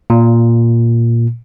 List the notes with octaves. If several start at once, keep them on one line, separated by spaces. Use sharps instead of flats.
A#2